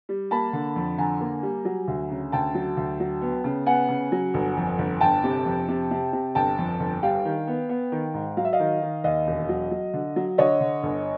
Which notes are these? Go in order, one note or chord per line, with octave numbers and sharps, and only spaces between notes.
G3
A#3 A5 B5
D3
F2
D3 G#5 A#5
A#3
G3
F#3
D2
C#3
D2 G5 A5
F#3
D2
F#3
B3
C#3
B3 F#5 G#5
C#3
F#3
G1
F2
G1
G1 G5 A5
C3
F2
C3
C3
C3
G1 G5 A5
F2
G1
G3 F5 G5
D#3
B3
B3
D#3
G#2
F#3 F5
E5
D#5 F5
D#3
D#3
D#2 D#5 F5
E1
F#3
F#3
D3
F#3
D3 C#5 D#5
D3
G1